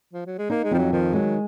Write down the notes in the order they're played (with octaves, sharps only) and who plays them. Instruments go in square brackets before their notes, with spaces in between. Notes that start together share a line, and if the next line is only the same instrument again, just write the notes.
[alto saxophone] F3
F#3
G#3
[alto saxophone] A#3 [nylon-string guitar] D#4
[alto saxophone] G#3
[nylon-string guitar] F2 [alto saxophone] F3
[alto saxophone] F#3
[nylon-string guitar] D#3 [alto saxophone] F3
[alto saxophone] F#3 [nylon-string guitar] G#3